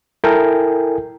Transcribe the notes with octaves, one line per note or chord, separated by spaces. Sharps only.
E4 A4 A#4 G5 G#5